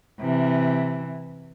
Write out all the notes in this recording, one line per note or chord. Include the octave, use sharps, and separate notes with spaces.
C3 E3